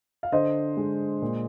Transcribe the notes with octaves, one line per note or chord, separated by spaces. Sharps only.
F5
D3 C5 D#5
G#3
A#2